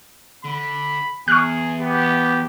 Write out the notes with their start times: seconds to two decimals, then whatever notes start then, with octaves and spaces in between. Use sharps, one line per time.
0.45 D3 B5
1.28 E2 G#4 C#6 F6 F#6
1.80 B3 G4